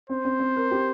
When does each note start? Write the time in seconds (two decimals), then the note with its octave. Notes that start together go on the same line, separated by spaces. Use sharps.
0.09 C4 C5
0.25 C4
0.40 C4
0.56 A#4
0.71 G4